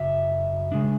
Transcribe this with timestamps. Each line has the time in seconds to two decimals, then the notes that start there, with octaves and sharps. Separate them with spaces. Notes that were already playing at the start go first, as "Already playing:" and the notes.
Already playing: F#2 C#3 F#3 E5
0.72 C#3 G#3 D4